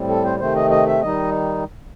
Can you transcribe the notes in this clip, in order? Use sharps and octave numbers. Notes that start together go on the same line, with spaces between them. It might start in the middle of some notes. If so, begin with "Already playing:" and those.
Already playing: A2 G3 C4
A4
C5
C3 D#3 A3 C4 C5
D#5
D#5
E5
D#3 G3 D#4 D#5